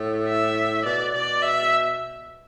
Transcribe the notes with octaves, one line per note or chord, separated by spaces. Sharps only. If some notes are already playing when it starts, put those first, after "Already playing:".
Already playing: A2
E5
B2 D5
B2 D5
E5